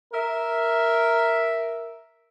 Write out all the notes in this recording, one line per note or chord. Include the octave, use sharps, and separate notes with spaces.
A#4 E5